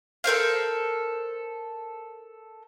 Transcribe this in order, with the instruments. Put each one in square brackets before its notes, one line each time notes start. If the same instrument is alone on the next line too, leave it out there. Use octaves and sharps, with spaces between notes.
[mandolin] A4 A#4 C5 F5